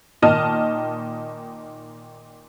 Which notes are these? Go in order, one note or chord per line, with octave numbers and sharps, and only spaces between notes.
A#2 D#3 D#5 A5 F6 D#7